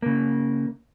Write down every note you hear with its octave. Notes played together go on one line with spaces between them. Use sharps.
C#3 A#3